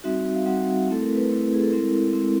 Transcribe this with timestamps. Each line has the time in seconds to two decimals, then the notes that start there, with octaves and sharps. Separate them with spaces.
0.04 G3 C4 D#4 F#4 E5
0.35 F5
0.46 G3 C4 D#4 F#4 F#5
0.88 A3 C4 E4 A4
1.01 A#4
1.16 B4
1.28 A3 C4 E4
1.53 G#4
1.62 A4
1.71 G#3 C4 E4 A#4
2.13 G#3 C4 E4